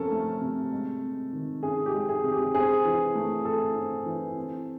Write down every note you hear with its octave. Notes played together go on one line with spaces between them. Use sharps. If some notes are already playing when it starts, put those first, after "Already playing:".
Already playing: C3 F3 C#4 A4 A#4
A3
C3
G#3
C3
D#3
C#4 G#4
G4
G#3
G#4
C3
G4
C4 G#4
E3
A3
E4 A4
C4
E3
C4